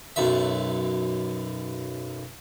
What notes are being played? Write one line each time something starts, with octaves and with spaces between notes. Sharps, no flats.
B1 F#2 E5